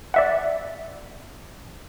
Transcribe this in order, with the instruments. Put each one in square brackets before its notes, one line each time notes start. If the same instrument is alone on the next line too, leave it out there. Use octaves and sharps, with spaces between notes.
[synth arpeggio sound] D5 E5 F#5